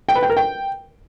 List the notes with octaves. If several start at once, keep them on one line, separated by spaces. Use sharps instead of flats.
G5
B4
G5
A#4
G5